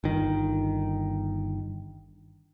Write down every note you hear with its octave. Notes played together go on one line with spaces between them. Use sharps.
G1 D#3